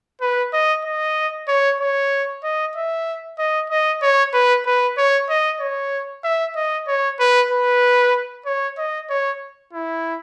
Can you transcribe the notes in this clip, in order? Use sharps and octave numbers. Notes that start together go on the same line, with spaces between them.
B4
D#5
D#5
C#5
C#5
D#5
E5
D#5
D#5
C#5
B4
B4
C#5
D#5
C#5
E5
D#5
C#5
B4
B4
C#5
D#5
C#5
E4